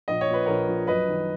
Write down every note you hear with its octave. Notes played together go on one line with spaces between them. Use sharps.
A#1 D#5
C#5
A#2 B4
A#1 A#4 C#5
F3
F#2 B4 D#5
D#3